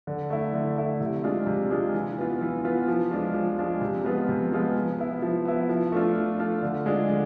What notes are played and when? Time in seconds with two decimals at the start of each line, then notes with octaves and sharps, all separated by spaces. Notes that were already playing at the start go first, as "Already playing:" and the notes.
0.07 D3
0.30 A3 E4
0.54 D3
0.77 A3 E4
1.01 C3
1.24 G#3 D4 F4
1.47 C3
1.71 G#3 D4 F4
1.94 E3
2.18 B3 F4
2.41 E3
2.65 B3 F4
2.88 F3
3.11 G#3 D4 F4
3.34 F3
3.59 G#3 D4 F4
3.82 C3
4.04 F3 G#3 B3 F4
4.29 C3
4.52 F3 G#3 B3 F4
4.75 F3
4.99 B3 E4
5.22 F3
5.45 B3 E4
5.69 F3
5.92 A3 D4 F4
6.16 F3
6.39 A3 D4 F4
6.63 D3
6.86 G#3 D4 F4
7.09 D3